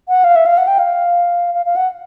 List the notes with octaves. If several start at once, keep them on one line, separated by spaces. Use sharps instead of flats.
F#5
F5
E5
F5
F#5
G5
F5
F5
F5
F#5